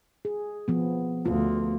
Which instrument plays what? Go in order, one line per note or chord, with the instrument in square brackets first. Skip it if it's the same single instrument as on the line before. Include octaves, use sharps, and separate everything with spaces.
[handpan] G#4
F3 B3
[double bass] D2 [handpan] F4